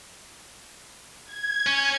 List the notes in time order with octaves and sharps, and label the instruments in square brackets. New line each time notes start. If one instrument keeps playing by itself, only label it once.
[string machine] G#6
[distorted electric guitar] C#4